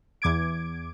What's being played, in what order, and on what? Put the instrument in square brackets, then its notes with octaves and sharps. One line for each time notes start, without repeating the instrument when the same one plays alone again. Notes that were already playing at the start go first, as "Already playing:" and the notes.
[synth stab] E2 D6 G#6 D7